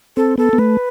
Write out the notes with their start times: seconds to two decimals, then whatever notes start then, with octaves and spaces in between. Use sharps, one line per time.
0.17 C4 A4
0.38 B3 A4
0.53 B3
0.58 A3 B4